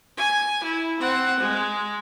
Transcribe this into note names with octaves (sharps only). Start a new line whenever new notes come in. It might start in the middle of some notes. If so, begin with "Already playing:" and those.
G#5
E4
C4 F#5
G#3